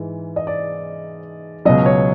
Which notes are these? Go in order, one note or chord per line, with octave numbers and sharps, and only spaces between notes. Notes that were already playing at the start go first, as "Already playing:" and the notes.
Already playing: G#2 E3
D#5
D5
C#2 B2 F#3 D#5
C#5